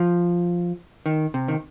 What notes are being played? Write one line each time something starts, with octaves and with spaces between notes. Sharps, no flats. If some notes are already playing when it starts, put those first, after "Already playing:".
Already playing: F3
D#3
C3
D#3